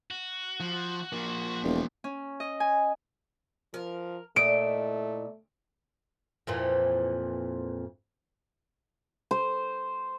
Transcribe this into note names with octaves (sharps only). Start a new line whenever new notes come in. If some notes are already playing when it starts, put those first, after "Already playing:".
F#4
F3
F3 A#3
E1
C#4
D#5
G#5
F3 A#4
A#2 A3 E4 D#5 D7
F2 A#2 E3
C5